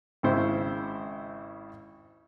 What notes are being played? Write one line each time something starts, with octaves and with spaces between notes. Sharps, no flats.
G#1 G#2 C#3 E4 C5